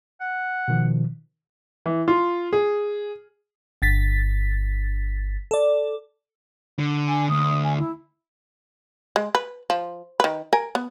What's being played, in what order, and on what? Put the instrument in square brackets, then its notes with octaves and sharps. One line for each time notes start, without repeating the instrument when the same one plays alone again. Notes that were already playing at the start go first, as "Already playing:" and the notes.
[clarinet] F#5
[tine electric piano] B2 D#3 F3
[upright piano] E3
F4
G#4
[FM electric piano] G1 A6 B6
A4 D5
[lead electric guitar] D3
[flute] G#5
[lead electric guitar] D2 [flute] D#6
[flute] G#5
E4
[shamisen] G#3
B4
F3
D#3 B4
A#4 G#5
B3